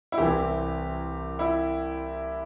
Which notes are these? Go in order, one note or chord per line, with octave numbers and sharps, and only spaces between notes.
E4
C2 C3 E3 G4
E4